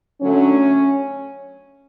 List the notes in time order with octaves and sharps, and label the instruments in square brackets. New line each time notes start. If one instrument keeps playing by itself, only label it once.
[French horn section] D3 F#3 A3 C#4